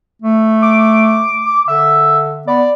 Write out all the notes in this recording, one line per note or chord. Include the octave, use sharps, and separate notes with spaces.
A3
D6
D3 E5
B3 D5